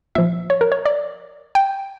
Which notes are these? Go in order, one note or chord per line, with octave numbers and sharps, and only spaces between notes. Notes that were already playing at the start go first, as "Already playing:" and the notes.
A#2 F3 E5
C#5
A#4
C#5
D5
G5